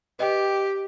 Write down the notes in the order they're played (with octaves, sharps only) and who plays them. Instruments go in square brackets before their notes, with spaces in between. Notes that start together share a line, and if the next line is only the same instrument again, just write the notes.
[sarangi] G4 [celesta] B4 D#5 G5